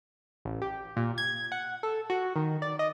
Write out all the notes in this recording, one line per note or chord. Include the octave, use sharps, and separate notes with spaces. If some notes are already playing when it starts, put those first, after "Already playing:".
A1
G4
A#2
G#6
F#5
A4
F#4
D#3
D5
D#5